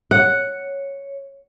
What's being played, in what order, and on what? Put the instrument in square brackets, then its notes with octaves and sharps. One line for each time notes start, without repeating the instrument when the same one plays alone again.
[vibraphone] C#5 [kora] F#5